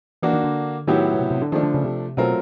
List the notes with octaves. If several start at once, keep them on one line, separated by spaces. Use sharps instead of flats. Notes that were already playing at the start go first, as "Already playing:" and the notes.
E3 A#3 D4 F#4
D#3
D3
A2 D#3 F#3 B3 E4 G4
B2
C3
C3
D3
D#3 F3 A3 D4
D3
C#3
C3
B2 F#3 A3 C4 F4 A#4